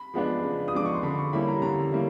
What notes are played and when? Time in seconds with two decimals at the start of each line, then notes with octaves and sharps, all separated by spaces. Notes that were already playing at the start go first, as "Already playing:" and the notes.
Already playing: B5
0.14 F3 G#3 B3 D4
0.43 C#3
0.68 D#6
0.73 F3 G#3 B3 D4 D6
0.85 C#6
0.94 C6
1.03 D3 B5
1.18 C#6
1.33 G3 A#3 C#4 E4 B5
1.48 A#5
1.62 D3 A#5
1.92 G3 A#3 C#4 E4